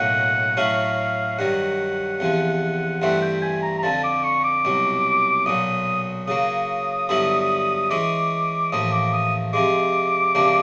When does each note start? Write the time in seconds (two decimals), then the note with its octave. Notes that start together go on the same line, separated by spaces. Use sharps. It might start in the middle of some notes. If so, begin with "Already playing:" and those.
Already playing: B1 A2 F#3 A#3 D#4 F#5
0.57 A2 F#3 A3 C#4 F#4 F5
1.38 G2 D#3 F#3 F#5
2.20 E2 C3 F3
3.02 G2 E3 A3 C4 F#5
3.22 G5
3.43 G#5
3.63 A#5
3.78 A#5
3.83 F2 D3 F3 A5
4.04 D6
4.24 C#6
4.44 D6
4.65 C2 B2 F#3
5.46 B1 A#2 F#3 D#6
6.27 C#3 F#3 A#3 D#6
7.09 G2 D3 F#3 B3 E4
7.90 E3 G#3 C#4 D6
8.72 A1 A2 F3 A#3 D#6
8.92 D6
9.13 D#6
9.53 C3 F3 G#3 D6
10.35 C#2 C3 F3 A#3 D4